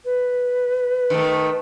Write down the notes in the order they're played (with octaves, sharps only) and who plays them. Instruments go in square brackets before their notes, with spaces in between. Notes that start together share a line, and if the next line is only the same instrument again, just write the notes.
[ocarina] B4
[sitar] D#3 A3